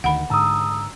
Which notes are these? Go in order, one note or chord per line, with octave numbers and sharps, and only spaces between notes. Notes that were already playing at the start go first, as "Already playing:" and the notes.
D2 D#3 F#5 B5
G#2 D3 A5 A#5 D#6 E6